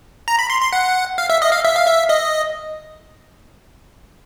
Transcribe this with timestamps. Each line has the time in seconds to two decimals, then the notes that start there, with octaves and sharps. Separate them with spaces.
0.28 A#5
0.39 B5
0.50 C6
0.61 C6
0.73 F#5
1.18 F5
1.30 E5
1.42 D#5
1.52 F5
1.65 E5
1.75 F5
1.86 E5
2.09 D#5